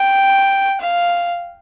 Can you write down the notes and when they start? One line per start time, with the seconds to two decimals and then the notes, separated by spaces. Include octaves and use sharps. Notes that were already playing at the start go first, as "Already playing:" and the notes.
Already playing: G5
0.81 F5